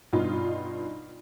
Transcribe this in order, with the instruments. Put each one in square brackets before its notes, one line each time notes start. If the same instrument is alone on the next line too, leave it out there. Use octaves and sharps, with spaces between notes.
[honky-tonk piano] G2 B2 D#4 F4